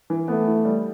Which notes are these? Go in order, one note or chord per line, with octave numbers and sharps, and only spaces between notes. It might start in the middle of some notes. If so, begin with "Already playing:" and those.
E3
A3 B3
E3
G3